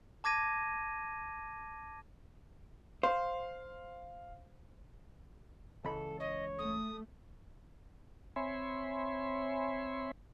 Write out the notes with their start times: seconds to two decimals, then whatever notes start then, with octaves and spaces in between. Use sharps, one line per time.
0.24 A5 D6 G#6 A#6 D#7
3.03 C5 F5
5.85 C#2 E3 A4 B5
6.19 C#5 D#5
6.58 A3 D#6
8.36 C4 C#5 E5 G#5 B5 C6